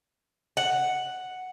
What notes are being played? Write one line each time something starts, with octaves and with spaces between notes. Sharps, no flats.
F#5